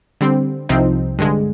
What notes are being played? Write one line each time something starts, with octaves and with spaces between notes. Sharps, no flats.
D3 G3 C4
C2 C3 F3 C4 D#4
G2 D3 G#3